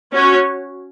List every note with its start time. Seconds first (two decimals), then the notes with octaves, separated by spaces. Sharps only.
0.13 C#4 F#4 C#5